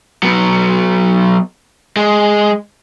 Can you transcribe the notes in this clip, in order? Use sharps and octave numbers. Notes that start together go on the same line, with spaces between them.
F#3 B3
G#3